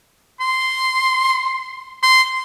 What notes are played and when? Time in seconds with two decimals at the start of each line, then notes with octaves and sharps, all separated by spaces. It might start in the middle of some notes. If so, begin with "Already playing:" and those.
0.40 C6
2.03 C6